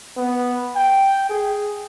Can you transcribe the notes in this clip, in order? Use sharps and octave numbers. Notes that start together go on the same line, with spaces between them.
B3
G5
G#4